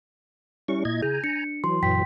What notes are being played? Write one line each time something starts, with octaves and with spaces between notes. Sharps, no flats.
G3 C#4 E4 C#6
A#2 D#5 G#6
C#3 G#4 G#5 A#5 G6
D4 C#7
E3 F#3 C6
F#2 A#2 G5 B6